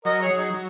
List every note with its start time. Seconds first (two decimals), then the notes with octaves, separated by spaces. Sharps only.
0.05 F#3 A#4 D#5
0.22 G#4 C#5
0.30 F#3
0.38 D#4 G#4
0.54 F#3